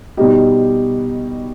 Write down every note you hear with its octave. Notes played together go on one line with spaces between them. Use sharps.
B2 G3 D#4 G4